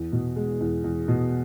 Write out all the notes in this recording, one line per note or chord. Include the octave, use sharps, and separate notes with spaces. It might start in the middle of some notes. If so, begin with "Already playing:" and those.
Already playing: E2
B2
G#3
E2
E2
B2